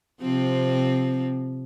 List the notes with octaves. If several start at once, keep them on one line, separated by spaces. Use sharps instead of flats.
C3 F3 C4